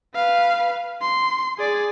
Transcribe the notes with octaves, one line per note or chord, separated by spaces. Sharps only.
B4 F5
C6
G#4 D5